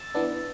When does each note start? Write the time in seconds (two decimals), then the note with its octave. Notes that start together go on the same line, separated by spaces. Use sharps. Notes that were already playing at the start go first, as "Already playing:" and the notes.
Already playing: E6 A6
0.15 E3 B3 D4